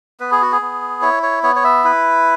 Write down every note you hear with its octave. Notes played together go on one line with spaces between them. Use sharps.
B3 B4
G#4
F#4
G#4
B3
E4 C#5
C#5
B3 C#5
C#5
E5
E4 B4